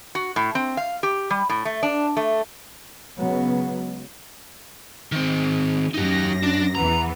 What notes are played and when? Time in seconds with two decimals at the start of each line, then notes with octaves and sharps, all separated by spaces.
0.15 F#4
0.36 A2
0.55 C4
0.77 F5
1.03 G4
1.30 G3
1.49 A2
1.65 A3
1.83 D4
2.17 A3
3.19 C#3 F#3 G#3 B3
5.12 D#3 C4
5.94 F#2 D#4 G4 A#6
6.43 D4
6.75 E2 E3 B3 A#5